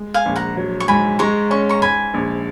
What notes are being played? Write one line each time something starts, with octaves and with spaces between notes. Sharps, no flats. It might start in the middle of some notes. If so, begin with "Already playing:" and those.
Already playing: G#3
F5 G#5
A#1
F#5 A#5
F#3
C#6
G#2 G#5 B5
G#3 A#5 C#6
C#4 C#6
A#5 C#6
G#2 G#5 B5
A#1